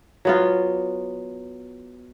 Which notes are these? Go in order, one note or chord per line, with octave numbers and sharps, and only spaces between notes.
F#3 B3 F4